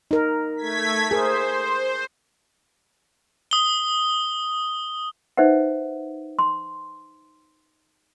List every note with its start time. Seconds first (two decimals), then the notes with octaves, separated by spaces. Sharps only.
0.11 D#4 A#4
0.57 A3 G#6 B6
1.11 G#4 A#4 C5
3.51 D#6 G7
5.37 D#4 B4 C5 E5 F#5
6.39 C6